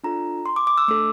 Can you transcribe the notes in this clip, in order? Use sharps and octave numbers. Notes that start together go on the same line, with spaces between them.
D4 F4 A4 A#5
C6
D6
D6
E6
A3 D4 A4 D6